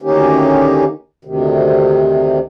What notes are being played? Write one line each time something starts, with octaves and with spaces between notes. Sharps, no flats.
D2 D#3 A#3 C#4 D#4 G4
D2 C3 D#3